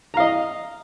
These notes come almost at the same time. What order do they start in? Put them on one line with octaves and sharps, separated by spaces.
A#5 F5 D#5